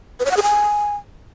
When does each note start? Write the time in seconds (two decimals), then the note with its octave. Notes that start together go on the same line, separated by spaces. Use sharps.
0.20 B4
0.25 C#5
0.31 F#5
0.37 G#4
0.43 G#5